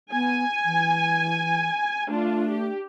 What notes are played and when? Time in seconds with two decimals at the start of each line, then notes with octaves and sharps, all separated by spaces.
0.12 B3 G#5
0.65 E3
2.08 A3 D4 F4
2.50 G4